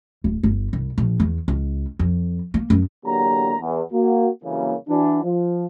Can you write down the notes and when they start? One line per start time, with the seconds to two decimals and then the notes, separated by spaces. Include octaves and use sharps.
0.24 D1
0.43 G1
0.73 C2
0.98 A#1
1.20 E2
1.48 C#2
1.99 F2
2.54 A#3
2.70 F#2
3.05 E2 D3 F#3 A#3 G4 A#5
3.60 E2
3.93 A#3 F#4
4.44 C2 F#2 C#3 E3 A#3
4.89 E3 D4 F#4
5.24 F3